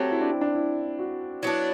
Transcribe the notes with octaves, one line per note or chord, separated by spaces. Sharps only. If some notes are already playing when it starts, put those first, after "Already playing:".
Already playing: F#3 A3 C4 G4
E4
D4
C4
D4
E4
F#4
F#3 B3 D4 E4